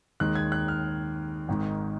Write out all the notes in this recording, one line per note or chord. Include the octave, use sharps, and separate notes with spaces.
D#2 D#3 G#3 F#6
G#6
F#6
F6
G#1 G#2 D#3 G#3